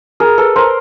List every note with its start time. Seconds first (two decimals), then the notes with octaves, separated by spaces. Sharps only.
0.20 G#4 A#4
0.38 A4 B4
0.56 A#4 C5